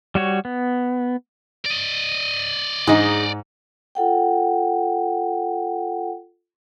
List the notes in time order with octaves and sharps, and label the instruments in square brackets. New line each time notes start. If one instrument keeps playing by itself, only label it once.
[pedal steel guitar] G3 F#4 C#5
B3
[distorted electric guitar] D5 D#5
[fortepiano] G#2 [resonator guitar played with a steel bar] D#4 G#4
[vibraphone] F4 A4 F#5 G5